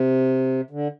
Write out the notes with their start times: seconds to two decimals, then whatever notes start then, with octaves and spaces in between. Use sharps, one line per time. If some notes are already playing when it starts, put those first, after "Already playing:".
Already playing: C3
0.70 D3